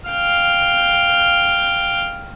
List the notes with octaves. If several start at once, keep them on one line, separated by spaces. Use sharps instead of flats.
F5 G5